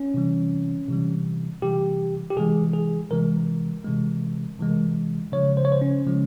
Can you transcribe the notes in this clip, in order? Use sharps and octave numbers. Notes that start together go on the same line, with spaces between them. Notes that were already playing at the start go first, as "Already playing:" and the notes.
Already playing: C#4
C3 E3 G3
C3 E3 G3
C3 E3 G3 G4
G4
C3 E3 G#3 G#4
G#4
C3 E3 G#3 A#4
C3 E3 G#3
C3 E3 G#3
C#3 F3 G#3 C#5
C5
C#5
C5
C#4
C#3 F3 G#3